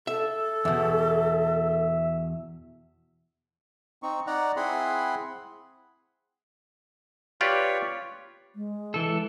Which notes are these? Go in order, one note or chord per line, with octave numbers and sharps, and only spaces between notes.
A4 E5
E2 B2 E5
C4 D#4 C#6
D#4 D5 F#5 A#5
C4 E4 G#4 F#5 B5 C6
F4 G4 B4 C#5 D5
G#3
E3 A4